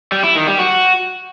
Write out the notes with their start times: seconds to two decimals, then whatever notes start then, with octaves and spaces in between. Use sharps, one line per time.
0.12 G3
0.24 E4
0.35 D#3
0.47 G3
0.59 F#4